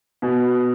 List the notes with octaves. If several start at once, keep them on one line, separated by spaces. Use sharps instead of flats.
B2